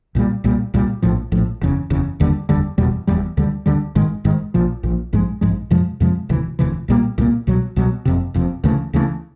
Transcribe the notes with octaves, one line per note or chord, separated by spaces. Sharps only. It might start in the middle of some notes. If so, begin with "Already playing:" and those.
C2 A#2 G3
C2 A#2 G3
C2 A#2 G3
A#1 A2 F3
A#1 A2 F3
F#1 E2 C#3
F#1 E2 C#3
F1 D#2 D3 G3
F1 D#2 D3 G3
F1 E2 B2 G3
F1 E2 B2 G3
D2 D3 G3
D2 D3 G3
G#1 G#2 D#3 G#3
G#1 G#2 D#3 G#3
A#1 A#2 F3
A#1 A#2 F3
A#1 G#2 F3 G#3
A#1 G#2 F3 G#3
F2 C3 F3 G#3
F2 C3 F3 G#3
E1 D2 C3 E3
E1 D2 C3 E3
C2 A#2 G3 A#3
C2 A#2 G3 A#3
C2 B2 F#3
C2 B2 F#3
F#1 F2 C3
F#1 F2 C3
D2 C#3 E3 A3
D2 C#3 E3 A3